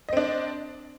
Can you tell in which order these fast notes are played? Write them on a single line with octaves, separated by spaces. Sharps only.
D#5 C4 D4